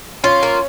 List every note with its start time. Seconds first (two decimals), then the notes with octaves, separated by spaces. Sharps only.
0.24 C#4 F4
0.43 A#3